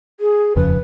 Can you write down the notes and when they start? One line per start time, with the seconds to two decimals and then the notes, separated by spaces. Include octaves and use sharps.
0.20 G#4
0.56 D#1 F2 C#3 B4